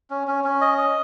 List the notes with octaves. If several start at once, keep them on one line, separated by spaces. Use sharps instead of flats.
C#4
C#4
C#4
D#5
D#5